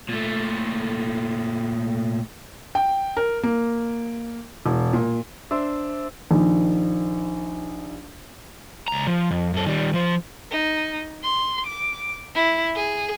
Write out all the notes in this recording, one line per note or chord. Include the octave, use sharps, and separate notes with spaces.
A#2 A3
G5
A#4
A#3
E1
A#2
D4 C5 E5
A#1 D#3
C#2 A#5
F3
F2
F#2 A4
D#3 G3
F3 C5
D#4
C6
D6
E4
G#4